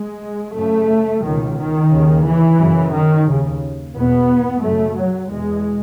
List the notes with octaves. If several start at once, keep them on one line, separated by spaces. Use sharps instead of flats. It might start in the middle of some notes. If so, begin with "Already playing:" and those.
Already playing: G#3
F#2 C#3 A3
C#2 B2 D#3
D#3
D#2 C#3
E3
F#2 C#3
D#3
D#2 C#3
E2 B2 B3
F#2 C#3 A3
F#3
E2 B2 G#3